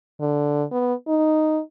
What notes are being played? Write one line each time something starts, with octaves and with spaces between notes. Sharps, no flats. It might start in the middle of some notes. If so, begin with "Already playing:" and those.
D3
B3
D#4